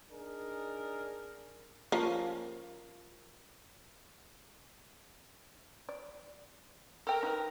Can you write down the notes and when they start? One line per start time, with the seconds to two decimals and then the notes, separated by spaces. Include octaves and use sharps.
0.11 D4 D#4 G#4 A#4
1.92 F3 A#3 C#4
5.89 D5
7.07 A4 A#4 G5
7.23 D#4 B4